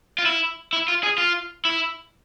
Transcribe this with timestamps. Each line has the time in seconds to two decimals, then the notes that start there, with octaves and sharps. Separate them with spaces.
0.18 F4
0.25 E4
0.73 E4
0.88 F4
1.03 G#4
1.18 F4
1.65 E4